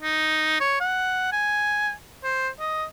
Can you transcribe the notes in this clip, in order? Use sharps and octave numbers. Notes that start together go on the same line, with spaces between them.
D#4
C#5
F#5
G#5
C5
D#5